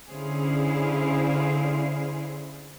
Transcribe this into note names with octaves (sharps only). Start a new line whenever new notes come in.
D3 C#4 E4 G#4 C5 F5